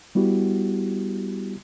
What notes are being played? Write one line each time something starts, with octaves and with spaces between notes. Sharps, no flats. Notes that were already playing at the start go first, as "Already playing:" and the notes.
G3 B3 E4 F#4 G4